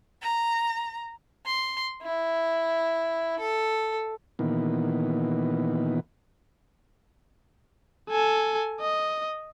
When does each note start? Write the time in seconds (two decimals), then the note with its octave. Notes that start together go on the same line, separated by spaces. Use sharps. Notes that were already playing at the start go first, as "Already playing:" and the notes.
0.21 A#5
1.46 C6
2.02 E4
3.39 A4
4.39 A#2 D#3 E3 B3
8.10 A4 G#5
8.80 D#5